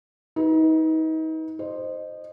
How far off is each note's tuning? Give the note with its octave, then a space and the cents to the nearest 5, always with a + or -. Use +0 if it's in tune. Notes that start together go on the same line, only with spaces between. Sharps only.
D#4 +35 B4 -5
C5 +0 D#5 -20